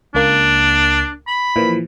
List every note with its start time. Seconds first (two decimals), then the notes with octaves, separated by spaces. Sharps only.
0.15 C#2 A#3 D4
1.27 B5
1.56 A#2 E3 F3